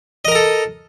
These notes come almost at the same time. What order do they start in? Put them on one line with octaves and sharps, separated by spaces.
D#5 A#4 A#5 A4